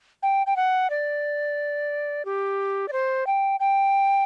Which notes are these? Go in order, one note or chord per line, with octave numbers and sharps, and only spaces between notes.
G5
G5
F#5
D5
G4
D5
C5
G5
G5